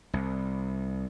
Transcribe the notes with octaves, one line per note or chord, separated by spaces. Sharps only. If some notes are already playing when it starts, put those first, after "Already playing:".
C2